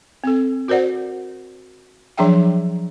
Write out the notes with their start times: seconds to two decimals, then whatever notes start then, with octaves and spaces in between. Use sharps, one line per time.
0.24 C4 A4
0.68 F#4 A#4 C5 D5 F#5
2.17 F3 F#3 D4 G#4 E5 G5